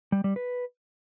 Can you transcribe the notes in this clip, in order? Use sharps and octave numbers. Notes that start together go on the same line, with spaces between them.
G3
G3
B4